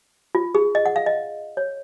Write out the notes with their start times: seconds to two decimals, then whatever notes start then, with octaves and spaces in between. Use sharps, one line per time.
0.35 F4
0.55 G#4
0.75 D#5
0.86 F#5
0.96 F5
1.06 D#5
1.57 C#5